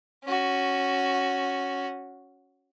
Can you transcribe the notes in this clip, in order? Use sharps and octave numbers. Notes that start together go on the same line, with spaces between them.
C#4 F#4